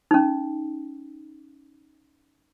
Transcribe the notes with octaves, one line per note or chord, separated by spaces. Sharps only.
C#4 D#4